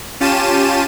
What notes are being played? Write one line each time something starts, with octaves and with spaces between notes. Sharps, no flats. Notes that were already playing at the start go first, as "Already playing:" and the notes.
C#4 F4 G4 A5 D#7 E7